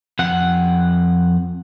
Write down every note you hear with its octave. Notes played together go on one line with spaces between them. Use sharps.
F2 F#5